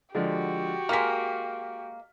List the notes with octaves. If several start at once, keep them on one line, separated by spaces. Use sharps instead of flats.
D3 F3 G#3 F#4 G4
G#3 A#3 F6 B6